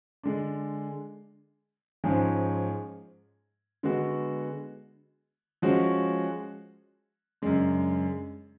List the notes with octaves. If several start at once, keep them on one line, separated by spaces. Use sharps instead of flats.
D3 G#3 D4
G#2 F3 G#3 C#4 G#4
D3 G#3 B3 F#4
F3 G#3 C#4 F#4
F#2 C#3 G#3 D4